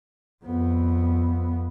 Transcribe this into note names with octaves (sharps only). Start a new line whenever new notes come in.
F2 B3